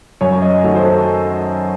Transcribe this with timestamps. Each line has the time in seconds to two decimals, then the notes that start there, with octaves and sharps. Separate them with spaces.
0.21 F#2 C#5
0.33 C#5
0.42 D#5
0.63 D#3 F#3 A3
0.75 C5
0.83 A4